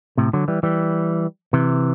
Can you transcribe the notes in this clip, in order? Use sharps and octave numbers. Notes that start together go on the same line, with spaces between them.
A2 C3
D3 F#3
E3 G3
E3 G3
C3 E3